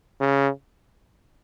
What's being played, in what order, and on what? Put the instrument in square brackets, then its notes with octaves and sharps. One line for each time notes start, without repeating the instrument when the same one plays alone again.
[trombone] C#3